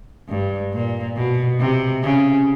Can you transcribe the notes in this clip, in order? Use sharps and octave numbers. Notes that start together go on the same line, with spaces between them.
G2
A#2
B2
C3
C#3